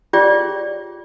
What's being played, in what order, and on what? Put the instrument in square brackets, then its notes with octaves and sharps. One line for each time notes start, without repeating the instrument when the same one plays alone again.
[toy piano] F4 G4 G#4 C#5 D5 G5